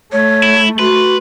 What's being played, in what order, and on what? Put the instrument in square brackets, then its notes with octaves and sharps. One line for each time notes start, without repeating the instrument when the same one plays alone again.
[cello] A3 [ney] C#5
[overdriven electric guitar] E4
[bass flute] F#4 [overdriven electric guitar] B4 [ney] C6